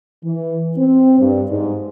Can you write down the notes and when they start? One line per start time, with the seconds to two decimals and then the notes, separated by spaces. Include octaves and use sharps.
0.24 E3
0.77 C4
1.19 G2
1.49 G#2